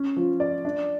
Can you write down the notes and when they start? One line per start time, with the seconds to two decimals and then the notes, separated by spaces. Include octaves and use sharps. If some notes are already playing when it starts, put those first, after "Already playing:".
Already playing: C#4
0.16 F3
0.40 D5
0.65 D4